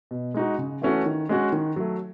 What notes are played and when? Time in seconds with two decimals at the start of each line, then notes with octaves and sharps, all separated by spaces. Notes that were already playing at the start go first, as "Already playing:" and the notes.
0.11 B2
0.34 G#3 D#4 F#4
0.58 C#3
0.82 E3 A3 C#4 F#4
1.06 D#3
1.29 G#3 C#4 F#4
1.52 D#3
1.76 F#3 A3